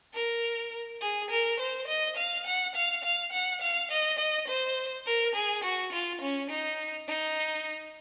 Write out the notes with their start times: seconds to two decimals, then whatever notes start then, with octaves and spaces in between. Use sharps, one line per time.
0.14 A#4
1.02 G#4
1.30 A#4
1.60 C5
1.88 D#5
2.17 F5
2.46 F#5
2.75 F5
3.04 F5
3.32 F#5
3.62 F5
3.91 D#5
4.19 D#5
4.48 C5
5.06 A#4
5.35 G#4
5.64 F#4
5.92 F4
6.21 C#4
6.50 D#4
7.08 D#4